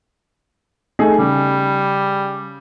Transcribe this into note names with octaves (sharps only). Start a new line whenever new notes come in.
A3 D#4 G#4
C#3 G3